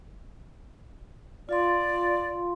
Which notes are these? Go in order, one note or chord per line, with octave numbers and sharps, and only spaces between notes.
F4 D5 F5 C6